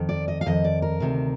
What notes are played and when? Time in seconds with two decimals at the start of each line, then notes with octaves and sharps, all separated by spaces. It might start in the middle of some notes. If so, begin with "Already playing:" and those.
Already playing: F2 D#3
0.09 D5
0.28 D#5
0.41 F5
0.46 F2 D#3 D#5
0.64 D5
0.82 A#4
1.00 D2 C3 D#3